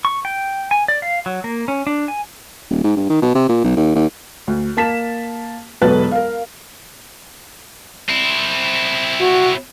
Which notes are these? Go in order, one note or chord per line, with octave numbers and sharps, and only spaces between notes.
C#6
G5
G#5
D5
F5
F#3
A#3
C#4
D4
G#5
D#1
G#2
G2
D#3
B2
C3
A#2
B1
D#2
D#2
D2
A#3 A5 B6 E7
E1 B1 F#3 A4 B4 A5
A#4 F5
C4 E4
F#4